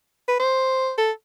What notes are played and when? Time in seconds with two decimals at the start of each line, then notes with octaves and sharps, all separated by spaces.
0.28 B4
0.40 C5
0.98 A4